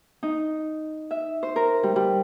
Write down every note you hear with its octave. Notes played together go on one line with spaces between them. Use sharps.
D#4
E5
C5
A#4
G3
G3